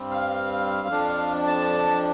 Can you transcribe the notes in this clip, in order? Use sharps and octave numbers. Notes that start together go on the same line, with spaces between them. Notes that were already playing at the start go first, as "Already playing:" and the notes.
Already playing: G2 G3 C4
F5
F2 F3 D4
A5